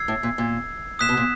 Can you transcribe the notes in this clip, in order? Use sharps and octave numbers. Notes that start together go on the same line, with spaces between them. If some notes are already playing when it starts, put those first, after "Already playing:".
Already playing: E6 G#6 C7
A2
A#2
A#2
A#2 D#6 F#6 B6 E7
B2
A#2